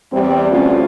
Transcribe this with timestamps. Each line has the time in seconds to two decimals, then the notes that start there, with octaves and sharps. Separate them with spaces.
0.12 E2 G3 C4
0.51 D2 C#4 F4